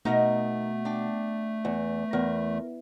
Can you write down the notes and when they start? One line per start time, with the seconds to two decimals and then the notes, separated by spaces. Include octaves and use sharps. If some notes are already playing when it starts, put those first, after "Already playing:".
0.05 B2 A3 D#4 A#4 D#5
0.85 D4 G5
1.65 E2
2.13 E2 A#4